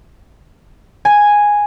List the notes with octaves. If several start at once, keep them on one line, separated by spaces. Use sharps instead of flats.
G#5